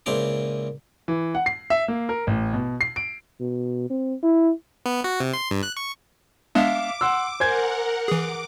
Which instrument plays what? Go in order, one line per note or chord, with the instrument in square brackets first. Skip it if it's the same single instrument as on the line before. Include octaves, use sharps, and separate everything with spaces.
[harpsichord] C#2 A#2 E4 C5 A#5 D6
[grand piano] E3
F#5
C7
E5
A#3
A#4
A1
B2
C7
D7
[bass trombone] B2
C4
E4
[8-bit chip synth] B3
F#4
C3
C6
G2
F#6
C#6
[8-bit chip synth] G#3 B3 D4 [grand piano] E5 F5 [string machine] D6
[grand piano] F#5 C6 E6
[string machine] A#4 F#5 [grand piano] C5 G#5 G#6
[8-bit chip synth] E3 G#4 [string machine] D6